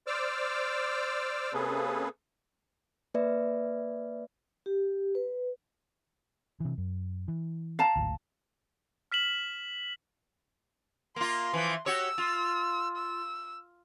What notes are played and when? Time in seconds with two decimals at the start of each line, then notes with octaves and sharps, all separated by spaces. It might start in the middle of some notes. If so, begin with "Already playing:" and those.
0.07 C5 D5 D6 E6 F6
1.53 C3 A#3 C#4 G#4 A4 B4
3.14 A#3 B4 D5 E5
4.66 G4
5.15 B4
6.60 C3 E3
6.78 F#2
7.28 E3
7.79 F5 A5 A#5
7.96 D1 G#1 D2
9.12 F6 B6 E7 F#7
11.16 A#3 F4 C6
11.54 E3 F3
11.86 F#4 G4 C#5 E6
12.18 F4
12.96 E6